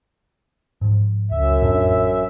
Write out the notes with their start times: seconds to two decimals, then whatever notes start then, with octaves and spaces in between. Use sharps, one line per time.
0.81 G#2 F3
1.31 C#2 F#2 E5
1.60 A1 F2 D4